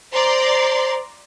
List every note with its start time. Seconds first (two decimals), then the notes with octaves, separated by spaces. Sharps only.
0.12 C5 D5 A#5 C6